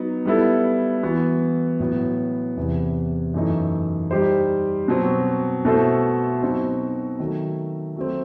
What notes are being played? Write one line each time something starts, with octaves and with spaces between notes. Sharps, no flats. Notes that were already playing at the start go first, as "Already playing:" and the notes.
Already playing: F#3 B3 D#4
G3 B3 E4 A4
E3 B3 F#4
A2 F#3 B3
E2 C3 E3
F#2 E3 A3 D#4
G3 D#4 G4 C5
B2 F#3 C4 F#4
B2 A3 E4 A4 C5
B2 F#3 C4 D#4 F#4
D#3 F#3 A3
F#3 A3 C4